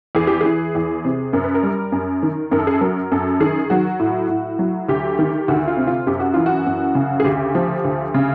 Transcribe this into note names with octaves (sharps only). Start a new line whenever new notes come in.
E2 G#4
G4
E3 G#4
E2
C3
F#2 A#4
B4
A#4
G3
F#2
D#3
F#2 A#4
A4
G#4
A4
F#3 A#4
F#2 A4
D#3 G#4
F#3 F#4
A2
A2
F#3
D2 G4
D#3
D2 F#4
F#4
F4
C3
F4
F#2 G4
F#4
E3 F4
F#4
F#2
C#3
G#4
D2 G4
F3
D2
C#3